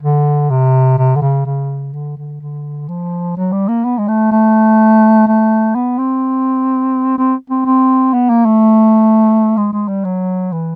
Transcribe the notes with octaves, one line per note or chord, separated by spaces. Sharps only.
D3
C3
C3
D3
C#3
C#3
D3
D3
D3
F3
F#3
G3
A#3
B3
G#3
A3
A3
A3
B3
C4
C4
C4
C4
B3
A#3
A3
G#3
G#3
G3
F#3
E3